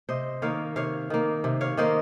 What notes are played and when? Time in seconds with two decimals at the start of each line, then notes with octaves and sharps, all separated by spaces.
0.09 C3 C5 D#5
0.42 D#3 A#3 C#5 F5
0.76 C3 C#5 F5
1.10 D#3 A#3
1.44 C3
1.61 C#5 F5
1.77 D#3 A#3 C5 D#5